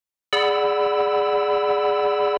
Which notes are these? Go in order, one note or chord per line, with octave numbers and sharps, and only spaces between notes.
G#4 D5 F#5 B5 E6